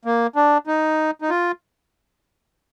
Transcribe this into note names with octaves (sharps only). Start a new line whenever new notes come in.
A#3
D4
D#4
D#4
F4